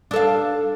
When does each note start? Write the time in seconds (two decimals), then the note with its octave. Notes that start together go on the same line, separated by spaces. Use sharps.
0.11 D4
0.13 A4
0.16 F5